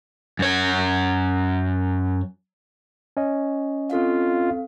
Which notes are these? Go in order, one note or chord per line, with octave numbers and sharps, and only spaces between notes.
F#2 C#5
C#4 D#5
C4 F4 A4 F5